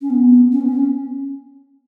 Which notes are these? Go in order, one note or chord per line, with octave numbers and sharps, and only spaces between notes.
C#4
B3
C#4
B3
C#4